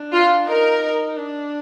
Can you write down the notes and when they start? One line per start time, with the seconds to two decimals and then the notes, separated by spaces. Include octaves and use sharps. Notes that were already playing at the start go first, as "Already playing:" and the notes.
Already playing: D4
0.12 F4
0.47 D#4 A#4
0.82 D#4
1.17 D4